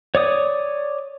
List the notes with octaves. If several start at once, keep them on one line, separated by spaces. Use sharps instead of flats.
C#5 D5 D#6